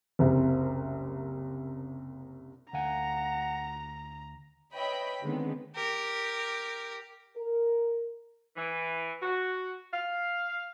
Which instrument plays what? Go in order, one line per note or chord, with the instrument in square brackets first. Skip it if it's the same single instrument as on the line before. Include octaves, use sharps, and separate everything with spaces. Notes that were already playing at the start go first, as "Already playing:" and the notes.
[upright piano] F#1 C2
[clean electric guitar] D2 F5 G#5 [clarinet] F#5 [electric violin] A#5
[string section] B4 C#5 D#5 E5 G5 B5
D3 D#3 G#3 B3 C4
[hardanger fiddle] G4 A#4
[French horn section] A#4
[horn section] E3
F#4
F5